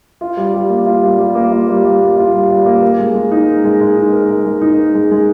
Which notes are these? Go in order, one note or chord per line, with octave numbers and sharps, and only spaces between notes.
F4
G3
G3
A#3
F4
G3
G3
A#3
F4
G3
G3
A#3
F4
G3
G3
A#3
A#4
G#3
G#3
D#4
A#4
G#3
G#3
D#4
A#4
G#3
G#3
D#4
A#4
G#3
G#3